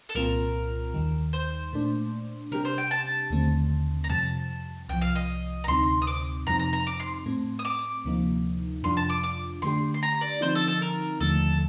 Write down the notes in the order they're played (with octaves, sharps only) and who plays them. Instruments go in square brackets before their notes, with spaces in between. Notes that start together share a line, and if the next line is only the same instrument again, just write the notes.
[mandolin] A4
[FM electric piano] C2 A#2 G3 C4 F4 [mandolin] A#4
[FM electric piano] D#2 D#3 G3
[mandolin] C5
[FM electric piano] A#2 A3 D4
[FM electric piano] C3 G3 D4 G4 [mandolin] A#4
[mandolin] C5
G5
A5
[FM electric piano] D#2 D3 A3 C4
[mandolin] A#5
[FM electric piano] F2 C3 G3 [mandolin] A5
[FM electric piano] C2 C3 F3 [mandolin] G5
[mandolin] F5
D#5
A#5
[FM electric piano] D2 C3 G3 C4 D#4 [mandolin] C6
[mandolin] D#6
D6
[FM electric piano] F2 C3 G3 C4 D#4 [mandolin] A#5
[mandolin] A#5
A#5
D6
C6
[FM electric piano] A2 A3 C4
[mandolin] D#6
D6
[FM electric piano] D2 C3 F3 A#3 D#4
[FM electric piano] F2 C3 G3 D4 F4 [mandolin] C6
[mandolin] A5
D6
D6
[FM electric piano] D3 A3 D4 G4 [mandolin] C6
[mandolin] C6
A#5
D5
[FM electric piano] D3 F3 C4 D#4 [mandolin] C5
[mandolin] A4
A4
A#4
[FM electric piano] D#2 D3 F3 A3 D#4 [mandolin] A4